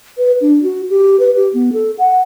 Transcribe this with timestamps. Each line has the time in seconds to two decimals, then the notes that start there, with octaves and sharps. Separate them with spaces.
0.18 B4
0.41 D4
0.63 F#4
0.90 G4
1.20 B4
1.36 G4
1.54 B3
1.73 A4
1.99 F#5